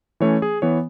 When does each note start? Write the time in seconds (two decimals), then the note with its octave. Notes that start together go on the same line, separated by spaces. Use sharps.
0.20 E3 A3 C#4 C#5
0.42 G#4
0.62 E3 B3 C#5